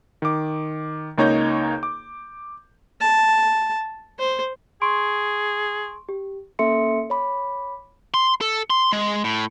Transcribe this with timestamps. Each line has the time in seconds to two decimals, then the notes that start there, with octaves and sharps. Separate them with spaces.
0.22 D#3 D6
1.18 C#2 A#3 D#4 C#5 A#5 G6
1.83 D6
3.01 A5
4.19 C5
4.82 G#4 C6 C#6 D7
6.09 G4
6.59 A#3 C#4 A4 E5 C6 C#7
7.10 C#5 B5 D6
8.14 C6
8.41 A4
8.70 C6
8.92 G#3
9.24 A2